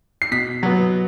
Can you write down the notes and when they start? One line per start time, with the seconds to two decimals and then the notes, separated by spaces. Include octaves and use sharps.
0.22 C7
0.31 B2 B6
0.63 F#3 B3